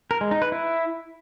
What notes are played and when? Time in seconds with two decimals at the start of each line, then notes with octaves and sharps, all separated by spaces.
0.11 A#4
0.21 G#3
0.31 D#4
0.42 B4
0.52 E4